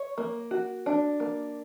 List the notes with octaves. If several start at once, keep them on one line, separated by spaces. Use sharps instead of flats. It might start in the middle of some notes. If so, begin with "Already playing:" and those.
Already playing: C#5
A#3
F#4
D4
A#3